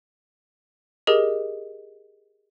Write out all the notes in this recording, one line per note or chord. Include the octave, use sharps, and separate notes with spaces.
G4 G#4 A#4 D#5